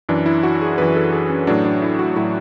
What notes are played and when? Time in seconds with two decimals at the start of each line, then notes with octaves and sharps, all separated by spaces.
0.09 F#2 E3 D4
0.26 E4
0.43 F#4
0.61 G#4
0.78 F#2 E3 B4
0.96 A4
1.12 G#4
1.30 C#4
1.47 A2 F#3 D4
1.65 D4
1.82 E4
1.99 F#4
2.16 A2 F#3 E4